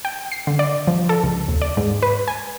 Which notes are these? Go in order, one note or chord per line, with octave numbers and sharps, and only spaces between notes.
G5
C7
D3
D5
F3
A4
C#2
D#2
D5
G#2
B4
G#5